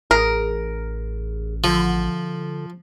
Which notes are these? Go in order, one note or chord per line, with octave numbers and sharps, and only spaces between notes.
A1 G#4 A#4
D3 F3